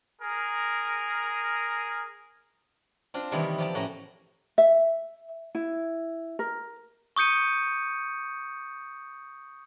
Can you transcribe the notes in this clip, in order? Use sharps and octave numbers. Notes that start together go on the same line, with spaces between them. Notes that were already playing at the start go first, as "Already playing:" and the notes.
G#4 A#4
C4 D4 F4
C3 D#3 E3 G3 B3 E4
F3 G4 D5 A5
A2 A3 C#4 F#4 A#5
E5
E4
A#4
C#6 D#6 G6 C#7 D#7